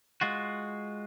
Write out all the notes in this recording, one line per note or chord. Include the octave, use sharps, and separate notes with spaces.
G#3 F4 F#4